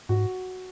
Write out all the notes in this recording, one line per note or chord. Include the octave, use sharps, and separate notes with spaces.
G#2 F#4